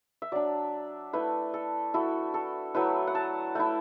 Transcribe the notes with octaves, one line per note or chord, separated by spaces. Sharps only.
E5
F#3 D4 D5
A3 E4 B4
A4
A3 E4 F#4
A4
F#3 A3 E4 B4
F#5
A5
A3 E4